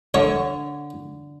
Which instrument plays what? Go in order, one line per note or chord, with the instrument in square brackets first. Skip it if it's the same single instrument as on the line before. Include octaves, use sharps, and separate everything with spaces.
[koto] D3 [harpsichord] C#5